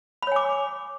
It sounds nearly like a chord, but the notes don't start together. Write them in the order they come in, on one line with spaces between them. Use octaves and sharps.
B5 C#5 G#5 D6